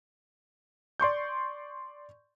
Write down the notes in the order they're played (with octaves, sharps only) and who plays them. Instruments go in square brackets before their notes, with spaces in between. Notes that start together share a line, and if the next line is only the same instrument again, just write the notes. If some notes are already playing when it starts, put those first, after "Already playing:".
[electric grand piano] D5 C6 C#6 G6